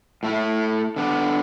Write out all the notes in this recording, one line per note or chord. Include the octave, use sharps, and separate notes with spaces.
A2 A3 E4
D3 B3 D4